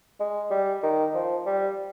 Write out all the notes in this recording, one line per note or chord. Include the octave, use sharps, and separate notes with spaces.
G#3
G3
D#3
F3
G3